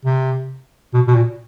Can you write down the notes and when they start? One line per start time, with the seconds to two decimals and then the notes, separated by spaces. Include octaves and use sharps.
0.05 C3
0.94 B2
1.07 B2
1.15 A#2